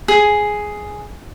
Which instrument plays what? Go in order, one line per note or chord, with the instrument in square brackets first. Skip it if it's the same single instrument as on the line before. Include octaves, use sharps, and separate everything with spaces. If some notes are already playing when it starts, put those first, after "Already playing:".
[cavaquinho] G#4